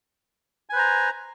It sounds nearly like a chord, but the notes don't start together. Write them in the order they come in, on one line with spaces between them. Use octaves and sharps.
G#5 B4 C5 A#5